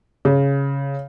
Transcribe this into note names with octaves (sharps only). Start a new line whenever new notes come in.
C#3